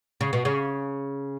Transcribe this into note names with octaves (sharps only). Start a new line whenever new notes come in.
C#3
B2
C#3